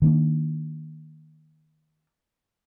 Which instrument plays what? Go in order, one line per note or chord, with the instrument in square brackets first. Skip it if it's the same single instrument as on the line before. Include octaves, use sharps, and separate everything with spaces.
[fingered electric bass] D#3 A#3 D4